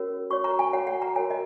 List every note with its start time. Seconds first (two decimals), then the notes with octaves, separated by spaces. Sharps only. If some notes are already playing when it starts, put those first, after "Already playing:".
Already playing: C#4 F#4 A#4 C#5
0.30 F#4 C#5 C#6
0.44 A#5
0.59 G#5
0.73 F#4 C#5 F#5
0.87 F#5
1.02 A#5
1.16 F#4 A#4 C#5 G#5
1.30 D#5